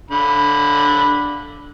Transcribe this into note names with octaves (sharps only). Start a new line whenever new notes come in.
D3 B5